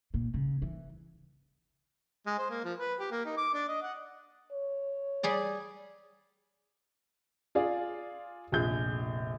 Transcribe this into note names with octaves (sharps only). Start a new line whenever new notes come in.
A#2
C#3
E3
G#3
C5
A#3
F3
B4
G4
A#3
D#4
D6
D4
D#5
F#5
C#5
G3 G#4 D5
F4 G#4 D5 F5
F1 A#1 F4 G#4 G6